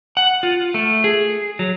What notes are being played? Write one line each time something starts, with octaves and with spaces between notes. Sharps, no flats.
F#5
F4
A3
G#4
F#3